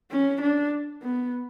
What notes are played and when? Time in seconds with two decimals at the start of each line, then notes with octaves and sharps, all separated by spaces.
0.11 C#4
0.41 D4
1.02 B3